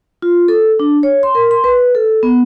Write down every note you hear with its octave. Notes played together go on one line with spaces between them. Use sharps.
F4
A4
D4
C#5
C6
A#4
C6
B4
A4
B3